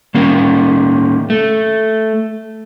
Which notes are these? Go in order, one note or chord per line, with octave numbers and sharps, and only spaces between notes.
D#3 A#3 C#4
A3